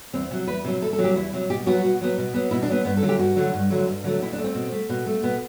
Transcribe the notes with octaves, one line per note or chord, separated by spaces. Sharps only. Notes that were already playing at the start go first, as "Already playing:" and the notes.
E2 C4
C3 F#3
E2 B4
C3 F#3
E2 A4
A4
C3 F#3
G4
E2 E4
C3 F#3
B2 G4
F#3 B3 F#4
B2
F#3 B3
B2
F#3 B3
B2 E4
D4
F#3 B3
G2 B3
A4
D3 F#3 A3
G4
G2 F#4
D3 F#3 A3
G2
D3 F#3 A3
G2
D3 F#3 A3
B2 E4
D4
A3
C4
B2
A3
B2
A3
B2 B3